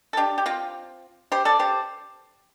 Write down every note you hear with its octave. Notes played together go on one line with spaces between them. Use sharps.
A4
D4 G4
G4
C4 F4
G4 C5
A4 D5
G4 C5